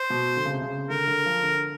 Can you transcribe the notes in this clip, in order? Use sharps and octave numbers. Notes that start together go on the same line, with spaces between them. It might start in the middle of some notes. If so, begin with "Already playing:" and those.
Already playing: C5
B2
D3
C#3
C3
C#3
D3 A#4
D3
F3
D3